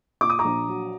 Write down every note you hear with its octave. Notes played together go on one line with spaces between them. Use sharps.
A#2 D6
D#6
A#5 D6
A#1
F#3